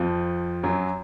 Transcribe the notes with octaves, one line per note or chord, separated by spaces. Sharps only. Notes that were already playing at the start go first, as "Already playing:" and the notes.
Already playing: F2 F3
F#2 F#3